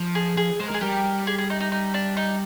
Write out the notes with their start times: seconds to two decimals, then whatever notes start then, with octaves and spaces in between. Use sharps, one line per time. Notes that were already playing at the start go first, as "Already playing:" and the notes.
Already playing: F3
0.15 G#4
0.37 F3 G#4
0.60 G#3 C5
0.67 A#4
0.71 G#3 G#4
0.81 G3 G4 A#4
1.27 G#4
1.38 G#4
1.50 D#4
1.60 D#4
1.72 D#4
1.94 D4
2.17 D#4